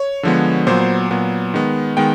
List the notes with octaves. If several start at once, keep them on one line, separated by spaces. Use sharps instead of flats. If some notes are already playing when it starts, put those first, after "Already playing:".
Already playing: C#5
D3 F3 G#3 B3
A#2 F#3 B3 C5
C5
A#2 F#3 B3
D#3 G#3 B3
D#3 G#3 B3 G5